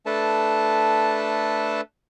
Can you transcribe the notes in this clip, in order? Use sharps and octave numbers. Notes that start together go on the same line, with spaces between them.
A3 D4 A4 B4 A5